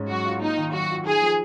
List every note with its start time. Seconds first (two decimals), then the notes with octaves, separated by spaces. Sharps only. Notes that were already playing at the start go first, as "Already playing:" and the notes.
Already playing: G#2 C#4
0.09 F#3 F#4
0.26 F4
0.41 A#3 D#4
0.57 D#3
0.73 F#3 F#4
0.90 F4
1.06 D#4 G#4
1.22 F3